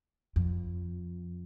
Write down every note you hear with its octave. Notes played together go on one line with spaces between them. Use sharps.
F2